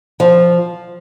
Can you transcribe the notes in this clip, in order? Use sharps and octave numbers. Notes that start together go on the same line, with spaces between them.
F3